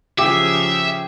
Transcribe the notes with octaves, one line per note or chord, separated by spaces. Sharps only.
C#3 F3 G4 G#4 E5